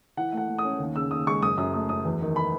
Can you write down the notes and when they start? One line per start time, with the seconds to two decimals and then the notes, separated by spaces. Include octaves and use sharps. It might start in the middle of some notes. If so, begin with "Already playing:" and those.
0.17 E3 F#5
0.33 A3 F#5
0.48 A3
0.59 D#6
0.64 C#4
0.79 D#2
0.95 C#3 E6
1.11 D#2 D#6
1.27 G#3 C#6
1.42 F#1 D#6
1.58 F#2 D#6
1.74 A3 D#6
1.89 F#2 D#6
2.05 E2
2.21 D#3
2.36 B5